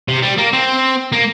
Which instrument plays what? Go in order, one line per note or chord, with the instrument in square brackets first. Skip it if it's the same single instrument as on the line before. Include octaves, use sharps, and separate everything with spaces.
[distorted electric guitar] C3
G3
A#3
C4
A#3